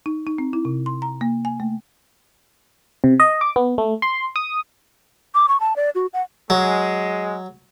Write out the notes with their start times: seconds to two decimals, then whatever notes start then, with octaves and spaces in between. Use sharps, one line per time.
0.06 D#4
0.27 D#4
0.38 C4
0.53 E4
0.65 C3
0.86 C6
1.02 A#5
1.21 A#3
1.45 G#5
1.60 A3
3.04 C3
3.20 D#5
3.41 D6
3.56 B3
3.78 A3
4.02 C6
4.36 D#6
5.35 D6
5.48 C#6
5.60 A5
5.76 D5
5.95 F#4
6.13 F#5
6.50 F#3 G#3